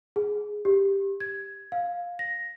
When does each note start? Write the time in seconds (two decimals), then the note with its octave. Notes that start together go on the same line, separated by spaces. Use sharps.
0.16 G#4
0.65 G4
1.20 G#6
1.72 F5
2.19 A#6